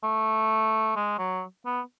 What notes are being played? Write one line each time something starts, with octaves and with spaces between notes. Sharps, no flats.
A3
G#3
F#3
B3